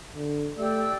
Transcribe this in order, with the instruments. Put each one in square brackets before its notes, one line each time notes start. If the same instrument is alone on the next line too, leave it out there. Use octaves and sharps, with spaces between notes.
[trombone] D3
[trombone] A3 [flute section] G4 D5 E6